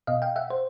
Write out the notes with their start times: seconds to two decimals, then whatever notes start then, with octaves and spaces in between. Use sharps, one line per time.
0.07 B2 D#5 F5
0.22 F5 G5
0.36 E5 F#5
0.50 C5